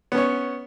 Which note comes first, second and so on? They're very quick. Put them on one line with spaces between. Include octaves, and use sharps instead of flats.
B3 C#4 C#5